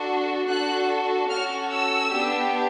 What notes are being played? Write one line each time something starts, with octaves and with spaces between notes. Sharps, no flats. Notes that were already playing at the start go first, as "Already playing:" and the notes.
Already playing: D4 F#4 A4
D4 F#4 A4 F#6
C#4 F#4 A4 F6
E6
B3 D4 G4